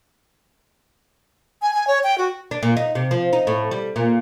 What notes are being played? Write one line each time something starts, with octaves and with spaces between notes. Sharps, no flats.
G#5
G#5
C#5
G5
F#4
D4
A#2
D#4
C3
F3
D#4
A2
G3
A#2